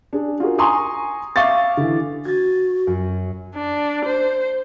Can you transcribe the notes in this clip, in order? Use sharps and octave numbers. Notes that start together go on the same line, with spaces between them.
D4 G#4
F4 F#4 G#4 A#4
G#5 A#5 C6 C#6 D#6
E5 F5 C#6 D6 A6
D3 E3
F#4 G#6 A6
F#2
D4
C5